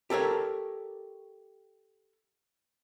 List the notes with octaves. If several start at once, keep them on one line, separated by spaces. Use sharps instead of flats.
G4 A4 A#4 C#5